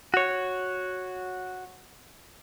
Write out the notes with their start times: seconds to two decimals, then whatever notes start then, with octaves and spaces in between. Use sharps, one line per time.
0.14 F#4 C#5